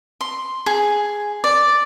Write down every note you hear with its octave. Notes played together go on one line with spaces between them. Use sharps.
C6
G#4
D5